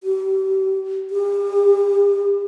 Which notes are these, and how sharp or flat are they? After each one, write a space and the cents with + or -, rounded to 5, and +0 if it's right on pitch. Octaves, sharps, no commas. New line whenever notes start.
G4 -35
G4 +40